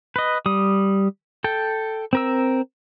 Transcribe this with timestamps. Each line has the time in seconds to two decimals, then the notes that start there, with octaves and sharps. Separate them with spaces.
0.16 B4 D#5
0.46 G3 D#6
1.44 A4 G5
2.13 C4 A#4 E6